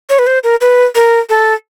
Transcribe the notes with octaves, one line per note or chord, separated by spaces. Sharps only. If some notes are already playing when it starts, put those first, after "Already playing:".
C#5
B4
C5
A#4
B4
A#4
A4